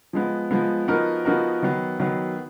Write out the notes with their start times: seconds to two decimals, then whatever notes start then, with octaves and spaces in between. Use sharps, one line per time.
0.13 F3 G#3 B3
0.51 F3 G#3 B3
0.88 F3 B3 D#4 F#4 A#4
1.25 F3 B3 D#4 F#4 A#4
1.62 D#3 F#3 B3
2.00 D#3 F#3 B3